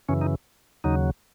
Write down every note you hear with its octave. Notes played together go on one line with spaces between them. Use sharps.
F#2 C#3 E3 C#4
D#4
D#2 C#3 F#3 D#4